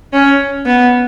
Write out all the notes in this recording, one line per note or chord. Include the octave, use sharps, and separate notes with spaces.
C#4
B3